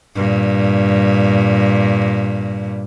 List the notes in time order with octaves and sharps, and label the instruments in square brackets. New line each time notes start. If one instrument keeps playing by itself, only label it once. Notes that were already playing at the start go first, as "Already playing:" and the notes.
[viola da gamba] G2 A#2